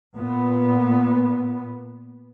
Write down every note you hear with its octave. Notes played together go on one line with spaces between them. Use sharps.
A#2 B3